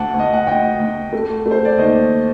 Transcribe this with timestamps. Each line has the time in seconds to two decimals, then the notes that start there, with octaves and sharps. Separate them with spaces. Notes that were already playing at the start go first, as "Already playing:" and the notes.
Already playing: D2 F#5 A5
0.14 D2
0.19 D#5
0.33 F#5
0.47 D2 D#5 G5
0.80 D2
1.13 A3
1.46 A3
1.51 C5
1.65 D5
1.78 D#2 C5 D#5